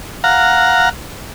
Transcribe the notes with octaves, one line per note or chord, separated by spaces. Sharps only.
F5 F#5 A#5